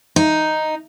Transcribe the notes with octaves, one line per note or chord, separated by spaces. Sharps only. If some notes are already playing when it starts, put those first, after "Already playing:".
D#4